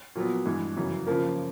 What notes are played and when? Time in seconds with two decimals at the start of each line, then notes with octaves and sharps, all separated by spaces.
0.15 A#2 F#3 B3
0.46 G2 E3 G#3
0.76 F#2 C#3 E3
1.07 C#3 F3 A#3